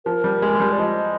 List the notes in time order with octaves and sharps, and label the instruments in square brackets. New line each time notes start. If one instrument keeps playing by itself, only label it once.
[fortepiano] F3 [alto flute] A#4
[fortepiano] G3
G#3
G#3
G3
[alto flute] D5
[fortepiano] F3 [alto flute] D#5